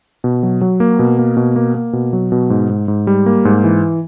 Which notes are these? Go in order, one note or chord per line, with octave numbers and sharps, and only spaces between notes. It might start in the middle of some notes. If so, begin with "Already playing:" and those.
B2
F#3
F#3
A#3
B2
A#3
B2
A#3
A#3
B2
F#3
B2
G#2
G#2
G#2
G3
A#3
G#2
E3